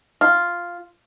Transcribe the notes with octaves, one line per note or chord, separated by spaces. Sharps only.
F4